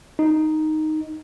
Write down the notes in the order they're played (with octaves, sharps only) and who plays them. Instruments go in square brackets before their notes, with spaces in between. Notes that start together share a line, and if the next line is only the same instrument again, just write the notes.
[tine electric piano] D#4